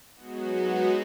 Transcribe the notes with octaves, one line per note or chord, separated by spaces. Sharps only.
F#3 G#3 B3 D#4 F#4